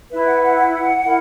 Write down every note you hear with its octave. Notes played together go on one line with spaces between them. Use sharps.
E4 B4 E5
F#5
F#5
F#5
E4 A#4